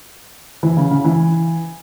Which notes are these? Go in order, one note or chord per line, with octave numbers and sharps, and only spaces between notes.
E3
C#3
C#3
E3